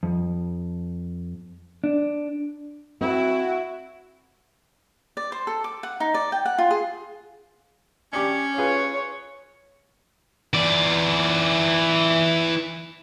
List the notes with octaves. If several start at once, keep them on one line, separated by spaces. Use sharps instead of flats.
F2
D4
C4 E4 F#4
D5
C5
A4
D6
F#5
D#4
D5
G5
F#5
F4
G#4
C#4 D4 G4 D6
F4 G#4 B4 C#5
E3 D5